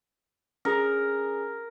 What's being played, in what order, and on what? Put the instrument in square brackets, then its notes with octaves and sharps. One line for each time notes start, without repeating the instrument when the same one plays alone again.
[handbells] C#4 G#4 [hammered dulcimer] A#4